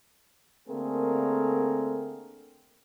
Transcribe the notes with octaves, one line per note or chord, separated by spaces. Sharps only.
D3 A3 A#3 C4 G#4 A#4